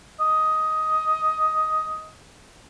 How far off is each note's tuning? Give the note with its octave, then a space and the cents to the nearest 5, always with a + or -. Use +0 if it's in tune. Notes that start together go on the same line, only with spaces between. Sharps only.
D#5 +10